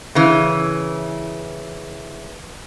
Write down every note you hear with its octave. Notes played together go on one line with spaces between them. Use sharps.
C#3 E3